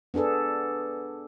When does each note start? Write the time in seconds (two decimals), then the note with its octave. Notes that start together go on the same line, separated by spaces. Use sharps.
0.14 B3 D4 G#4 A4 B4